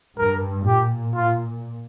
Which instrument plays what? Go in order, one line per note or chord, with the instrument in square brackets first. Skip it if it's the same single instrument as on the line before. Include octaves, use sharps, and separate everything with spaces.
[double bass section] G2 [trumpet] A#4
[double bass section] A#2 [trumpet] G4
[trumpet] F4